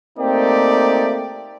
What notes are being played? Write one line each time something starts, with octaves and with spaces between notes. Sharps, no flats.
A3 A#3 C4 D#4 G4 D5